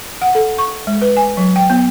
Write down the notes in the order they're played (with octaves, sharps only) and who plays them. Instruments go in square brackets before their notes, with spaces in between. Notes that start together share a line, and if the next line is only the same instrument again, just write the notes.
[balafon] F#5
A4
C#6
G#3
B4
G#5
F#3
G5
B3